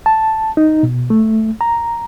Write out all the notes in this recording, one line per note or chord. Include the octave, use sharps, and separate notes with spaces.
A5
D#4
B2
A3
A#5